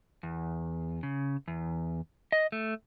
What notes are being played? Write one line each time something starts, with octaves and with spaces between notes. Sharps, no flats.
E2
C#3
E2
D#5
A3